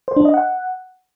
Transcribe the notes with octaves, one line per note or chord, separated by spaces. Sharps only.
C5
D4
D#5
F#5